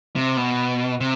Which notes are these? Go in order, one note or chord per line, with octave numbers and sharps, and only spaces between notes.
C3
B2
C3